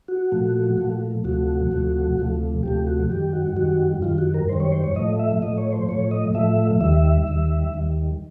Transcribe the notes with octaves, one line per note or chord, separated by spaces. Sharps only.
F#4
A#2 F3 A3
A#2 F3 A3
D2 C3 F3 A3 F#4
D2 C3 F3 A3
D2 C3 F3 A3
D2 C3 F3 A3 G4
F#4
F#2 D#3 G3 G4
F#4
F#2 D#3 G3 F#4
F#2 D#3 G3 F4
F#4
A#4
F#2 D#3 G3 C5
C#5
C5
C#5
A2 F3 A3 D#5
E5
A2 F3 A3 D#5
C#5
C5
A2 F3 A3 C#5
D#5
A2 F3 A3 E5
D#2 D#3 G3 E5
D#2 D#3 G3
D#2 D#3 G3